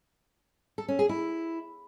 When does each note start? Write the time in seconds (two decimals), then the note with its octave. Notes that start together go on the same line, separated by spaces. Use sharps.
0.78 A4
0.88 C#4
0.99 G#4
1.09 E4